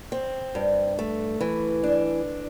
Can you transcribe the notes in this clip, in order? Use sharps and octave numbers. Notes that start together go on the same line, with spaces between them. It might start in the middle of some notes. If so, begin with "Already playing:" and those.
C4
G2
A3
E3
D4